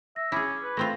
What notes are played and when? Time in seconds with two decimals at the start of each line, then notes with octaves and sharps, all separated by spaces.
0.16 E5 A#6
0.32 C#4 E4 G#4 D6 G#6
0.63 B4
0.77 A3 C4 F4 A#6